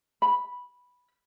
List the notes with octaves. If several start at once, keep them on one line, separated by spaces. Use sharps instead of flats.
B5